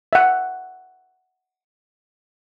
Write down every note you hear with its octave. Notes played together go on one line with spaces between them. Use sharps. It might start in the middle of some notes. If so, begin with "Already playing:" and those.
E5 F#5